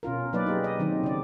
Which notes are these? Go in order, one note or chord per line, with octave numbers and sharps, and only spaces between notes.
B2 C#4 F4 A#4
F#3 A#3 D#4 B4 C#5 D5
D#4 G4 G#4
D#5
D#3 F#3 C4 D#4
C#3 D5